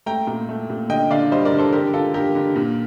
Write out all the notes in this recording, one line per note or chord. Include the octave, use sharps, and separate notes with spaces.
A3 G5 A#5
A#2
A3
A#2
D3 D#5 G5
D3 D5 F5
G3 C5 D#5
A#4 D5
D3
A4 C5
D3 G4 A#4
D3 F4 A4
D3 G4 A#4
D3
A#2